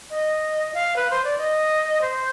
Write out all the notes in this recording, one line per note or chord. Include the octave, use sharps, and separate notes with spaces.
D#5
F5
B4
C5
D5
D#5
C5